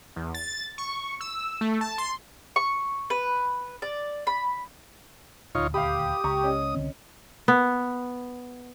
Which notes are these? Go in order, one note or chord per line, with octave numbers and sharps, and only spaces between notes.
E2
A6
C#6
E6
A3
A5
C6
C#6
B4
D5
B5
D#1 D2 D#4 F4 C#5
G4 F5 B5 D#6
C#2 A#5 C#6
C#4 D#5
C2 D3 C4
B3